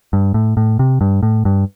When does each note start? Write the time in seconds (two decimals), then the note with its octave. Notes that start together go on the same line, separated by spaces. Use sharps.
0.13 G2
0.34 A2
0.57 A2
0.79 C3
1.01 G2
1.23 A2
1.45 G2